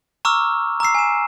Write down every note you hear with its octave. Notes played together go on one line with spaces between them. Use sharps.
A#5 C#6 D6 E6 F6
A#5 D6 E6 C7
G#5 E7